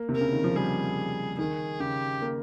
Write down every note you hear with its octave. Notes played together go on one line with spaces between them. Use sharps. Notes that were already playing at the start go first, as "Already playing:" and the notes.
Already playing: A#3
C3
A#4
C#3
D#3
F3
G3 G#4
D#3 G#4
C#3 G4
A#3